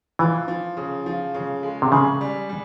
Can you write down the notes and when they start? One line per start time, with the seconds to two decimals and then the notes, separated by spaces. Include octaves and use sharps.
0.19 E3 F3
0.48 F3
0.77 C#3
1.06 F3
1.35 C#3
1.63 G#3
1.82 C3
1.92 C#3 G#4
2.21 G3
2.49 G3